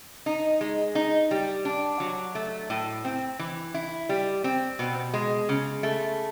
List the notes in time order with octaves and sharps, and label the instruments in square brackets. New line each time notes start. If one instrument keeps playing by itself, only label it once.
[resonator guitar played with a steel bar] D#4
G#3
D#4
G3
D4
F#3
A3
A2
C4
E3
E4
G3
C4
B2
G#3
C#3
A3